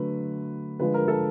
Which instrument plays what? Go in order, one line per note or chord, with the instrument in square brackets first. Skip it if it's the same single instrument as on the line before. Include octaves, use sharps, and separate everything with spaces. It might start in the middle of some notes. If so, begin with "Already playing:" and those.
Already playing: [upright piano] D3 F#3 A3 B4
D3 F3 G#3 B4
A#4
A4